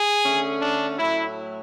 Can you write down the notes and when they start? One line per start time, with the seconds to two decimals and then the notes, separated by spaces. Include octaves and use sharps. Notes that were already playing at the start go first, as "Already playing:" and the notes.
Already playing: G#4
0.24 D3 A3 C#4
0.61 D4
0.98 A2 F#3 A3 E4